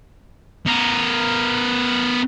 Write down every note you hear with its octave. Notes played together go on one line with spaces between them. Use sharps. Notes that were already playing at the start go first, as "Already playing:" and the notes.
B3 A#4